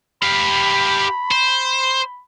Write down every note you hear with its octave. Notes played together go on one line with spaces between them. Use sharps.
G4 F5 B5
C5